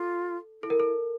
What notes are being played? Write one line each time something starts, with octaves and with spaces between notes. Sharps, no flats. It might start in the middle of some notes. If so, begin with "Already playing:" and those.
Already playing: F4 A4
E4 A4
A#4
A4